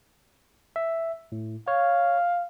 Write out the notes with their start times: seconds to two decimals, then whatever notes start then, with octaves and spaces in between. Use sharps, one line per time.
0.76 E5
1.32 A2
1.68 C#5 F5